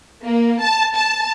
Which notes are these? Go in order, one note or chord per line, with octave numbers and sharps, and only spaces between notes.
A#3
A5
A5